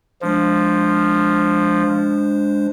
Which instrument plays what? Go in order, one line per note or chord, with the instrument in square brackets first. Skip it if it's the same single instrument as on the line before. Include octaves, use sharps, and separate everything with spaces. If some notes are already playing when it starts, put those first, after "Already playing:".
[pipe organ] F3 [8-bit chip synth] G#3 D4 C5